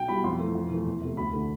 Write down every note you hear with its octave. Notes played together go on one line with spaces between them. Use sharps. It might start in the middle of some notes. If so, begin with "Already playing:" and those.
Already playing: B1 G5
B2 G3 B5
F2 C6
E3 A3
F2
E3 A3
E2
C3 F3 A3
D2 B5
D3 A3